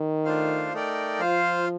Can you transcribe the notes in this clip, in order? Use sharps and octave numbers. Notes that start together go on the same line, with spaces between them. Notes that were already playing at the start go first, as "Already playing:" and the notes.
Already playing: D#3
A3 D4 F4 C5 F5
A3 D#4 A#4 D5 G5
F3 F4 C5 F5